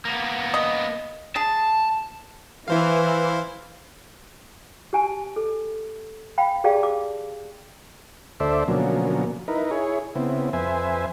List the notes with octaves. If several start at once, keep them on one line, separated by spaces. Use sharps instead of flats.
A#3 B3
D#5
G#4 A5
E3 E4 C5 F5
G4 G#5 A5
A4
F5 G5 B5
G4 G#4 D5 F5 G5 A5
D6
D2 A4 C5 D5 E5
B2 D3 F3 F#3 A#3 C#4
D#4 E4 A#4 B4
E4 G#4 C#5
C#3 B3 C4 E4
F2 B4 C5 E5 G#5